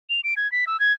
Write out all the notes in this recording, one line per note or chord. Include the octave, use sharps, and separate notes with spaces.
F7
D7
G#6
B6
E6
G#6